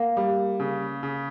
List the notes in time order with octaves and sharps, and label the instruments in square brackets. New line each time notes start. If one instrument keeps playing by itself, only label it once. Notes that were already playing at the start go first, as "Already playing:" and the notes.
Already playing: [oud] A#3
[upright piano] G3
C#3
C#3